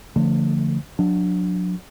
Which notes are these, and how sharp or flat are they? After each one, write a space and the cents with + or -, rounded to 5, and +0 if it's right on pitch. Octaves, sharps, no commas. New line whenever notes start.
D3 -10 F3 -20 A3 +30
F#3 -25 D4 +0